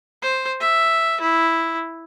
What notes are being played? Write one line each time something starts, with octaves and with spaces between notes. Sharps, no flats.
C5
E5
E4